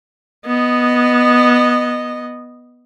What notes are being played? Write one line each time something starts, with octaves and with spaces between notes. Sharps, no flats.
B3 D#5